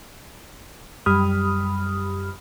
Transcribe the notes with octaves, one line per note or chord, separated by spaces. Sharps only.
F#2 G3 G4 B5 D#6 F6